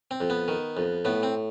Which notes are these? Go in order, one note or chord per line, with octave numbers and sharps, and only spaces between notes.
C4
F2
B3
D#3
F2
A2 B3
C4